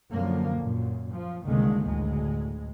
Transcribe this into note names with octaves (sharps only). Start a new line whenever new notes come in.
F#2 D3 F3 A#3
F#2 A#2
F3
F#1 C2 D3 D#3 G#3 A#3
D2 A2 G#3